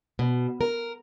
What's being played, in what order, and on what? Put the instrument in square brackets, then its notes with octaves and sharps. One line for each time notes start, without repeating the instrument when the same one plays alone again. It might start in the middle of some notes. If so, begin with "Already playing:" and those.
[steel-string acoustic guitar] B2
A#4